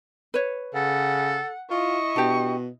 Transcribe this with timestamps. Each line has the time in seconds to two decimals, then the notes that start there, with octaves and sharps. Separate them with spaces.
0.34 B4 C#5
0.74 C#3 A4 F#5
1.71 E4 F4 D#5 C#6
2.16 B2 D4 G4